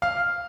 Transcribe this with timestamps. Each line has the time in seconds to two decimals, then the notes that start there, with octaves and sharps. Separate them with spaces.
0.02 F5 F6